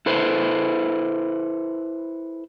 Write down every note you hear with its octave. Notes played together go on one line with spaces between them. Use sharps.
E4 A4 B4 C5